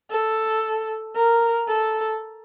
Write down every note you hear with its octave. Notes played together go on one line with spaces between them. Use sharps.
A4
A#4
A4